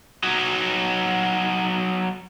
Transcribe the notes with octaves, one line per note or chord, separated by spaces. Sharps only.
F#3 D#4